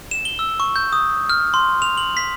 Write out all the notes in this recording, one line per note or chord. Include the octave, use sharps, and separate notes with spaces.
E7
G7
E6
C#6
G6
D#6
F6
C6
F7
F#7
B6